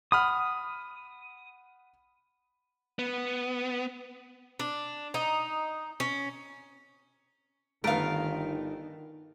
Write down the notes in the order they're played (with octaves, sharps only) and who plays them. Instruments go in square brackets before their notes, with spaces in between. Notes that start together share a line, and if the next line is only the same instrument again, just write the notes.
[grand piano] F#5 B5 F6 [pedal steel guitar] D#6
[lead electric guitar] B3
[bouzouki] D4
D#4
C#4
[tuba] G1 [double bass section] D#3 [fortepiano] A3 B3 [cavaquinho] A#4 F5